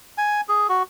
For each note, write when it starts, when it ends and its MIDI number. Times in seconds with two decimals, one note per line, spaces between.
0.18 0.41 80
0.49 0.67 68
0.69 0.83 66